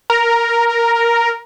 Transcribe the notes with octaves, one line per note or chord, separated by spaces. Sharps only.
A#4